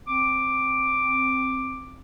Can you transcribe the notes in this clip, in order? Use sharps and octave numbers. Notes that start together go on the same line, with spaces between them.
C4 D6